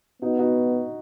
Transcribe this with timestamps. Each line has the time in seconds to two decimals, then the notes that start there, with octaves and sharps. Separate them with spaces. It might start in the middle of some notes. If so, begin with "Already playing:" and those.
0.22 B3 D#4 F#4
0.39 D#4 F#4